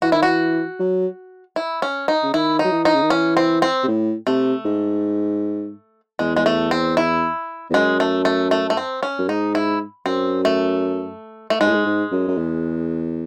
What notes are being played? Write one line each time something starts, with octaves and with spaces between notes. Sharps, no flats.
E3 F#4
D#3 E4
E3 F#4
F#3
E4
C#4
D#4
C#3
D#3 E4
D#4
F#3
E3
D#4
C#3
D#3
E3 C#4
C4
C4
C3
A2
C3 A3
G#2
E2 G#3
G#3
A3
C4
E4
E2
F#2 G#3
A3
A3
A3
A3
C4
C#4
F#2
G#2 D#4
E4
F#2 C4
A3
A3
G#2 G#3
A2
G#2
G#2
F#2
F#2
E2